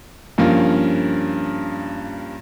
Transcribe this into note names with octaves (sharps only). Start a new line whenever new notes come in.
G2 F3 A#3 C#4